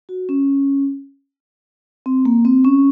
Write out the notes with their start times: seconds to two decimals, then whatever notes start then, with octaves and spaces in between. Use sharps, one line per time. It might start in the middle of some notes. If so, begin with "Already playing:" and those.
0.09 F#4
0.29 C#4
2.06 C4
2.25 A#3
2.45 C4
2.64 C#4